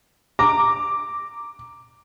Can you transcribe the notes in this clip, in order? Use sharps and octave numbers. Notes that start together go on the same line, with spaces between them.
A#5 D6